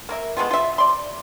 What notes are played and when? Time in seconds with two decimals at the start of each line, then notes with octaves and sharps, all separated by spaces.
0.09 A#3 A#4 E5
0.37 G#3 A3 B3 F4
0.51 F4 E5
0.78 D5 C6